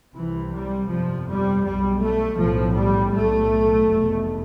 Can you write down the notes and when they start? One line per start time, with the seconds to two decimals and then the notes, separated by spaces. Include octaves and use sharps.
0.14 C2 C3 E3
0.52 G3
0.89 G1 F2 C3 F3
1.26 G3
1.63 B1 B2 G3
2.00 A3
2.37 B1 A2 F3
2.75 G3
3.12 B1 A2 A3
3.86 F1 E2 B2